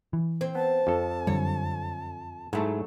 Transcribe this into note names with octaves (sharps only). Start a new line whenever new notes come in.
E3
C4
B3 A5
F2 A4
F#2 D3 G3 C#5
G#2 F#3 A3 E4 A5